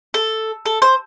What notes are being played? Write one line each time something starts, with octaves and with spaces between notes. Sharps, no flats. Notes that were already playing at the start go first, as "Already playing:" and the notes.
A4
A4
C5